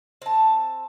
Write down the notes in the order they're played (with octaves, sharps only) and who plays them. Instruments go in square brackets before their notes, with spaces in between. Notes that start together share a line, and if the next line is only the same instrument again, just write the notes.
[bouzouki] C4 A5